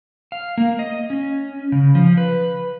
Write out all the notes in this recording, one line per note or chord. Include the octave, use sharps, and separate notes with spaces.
F5
A#3
D#5
C#4
C#3
F3
B4